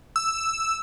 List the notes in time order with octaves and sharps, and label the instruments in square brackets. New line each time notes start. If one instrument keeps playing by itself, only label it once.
[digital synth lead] E6